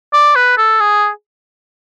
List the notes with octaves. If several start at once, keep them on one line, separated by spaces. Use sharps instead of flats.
D5
B4
A4
G#4